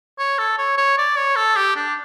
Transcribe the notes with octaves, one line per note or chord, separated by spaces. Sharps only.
C#5
A4
C#5
C#5
D5
C#5
A4
G4
D4